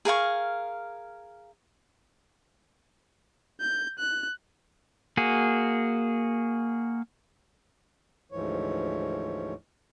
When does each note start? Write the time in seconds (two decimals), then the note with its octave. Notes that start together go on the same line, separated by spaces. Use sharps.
0.05 G#4 A#4 F5 C#6
3.60 G6
3.99 F#6
5.17 A#3 F#4 G#4
8.32 D2 G#2 E3 F3 C#5